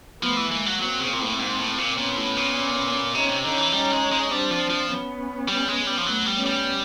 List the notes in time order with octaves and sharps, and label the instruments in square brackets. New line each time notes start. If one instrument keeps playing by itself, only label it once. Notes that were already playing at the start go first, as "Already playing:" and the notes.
[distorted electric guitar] F3 [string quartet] A3 B3
[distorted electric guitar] E3
[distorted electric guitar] E3 [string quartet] G#3 A#3
[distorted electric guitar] F#3
[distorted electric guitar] F#3 [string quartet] A#3 C4
[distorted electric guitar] C#3
A#2
A2
G#2
A2
A#2
[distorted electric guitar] A#2 [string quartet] B3 C#4
[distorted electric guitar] A2
A#2
[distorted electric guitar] C3 [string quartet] C#4 D#4
[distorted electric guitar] C3
[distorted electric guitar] D3 [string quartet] C#4 D#4
[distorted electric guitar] E3
[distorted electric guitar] G3 [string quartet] C#4 D#4
[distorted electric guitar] G#3
G#3
[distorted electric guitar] G3 [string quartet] C4 D4
[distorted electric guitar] F3
F3
[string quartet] B3 C#4
[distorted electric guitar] G3
G#3
G3
F3
[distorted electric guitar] F#3 [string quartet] A3 B3
[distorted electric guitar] G3
[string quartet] B3 C#4
[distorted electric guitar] G3